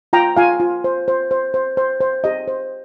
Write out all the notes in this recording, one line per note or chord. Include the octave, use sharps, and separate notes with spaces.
F4 G5 A#5
F4 F5 G#5
F4
C5
C5
C5
C5
C5
C5
G4 D#5
C5